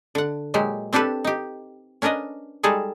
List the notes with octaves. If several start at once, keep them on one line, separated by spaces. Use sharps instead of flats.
D3 F#5
A#2 F#3 G#3 G4
C4 D4 G4 A4 B4
D#4 G4
C#4 D4 A#4 B4 D#5
G3 G#3 D#4 G#4 A4